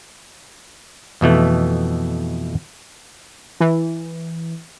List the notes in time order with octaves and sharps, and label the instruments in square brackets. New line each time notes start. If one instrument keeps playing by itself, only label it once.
[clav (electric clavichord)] F2 B2 E3 A3
[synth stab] E3